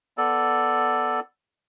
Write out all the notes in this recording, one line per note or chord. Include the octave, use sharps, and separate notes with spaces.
B3 A4 D5